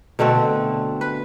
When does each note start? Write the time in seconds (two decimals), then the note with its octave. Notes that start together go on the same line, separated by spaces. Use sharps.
0.19 B2 D3 A3 C4
1.01 B4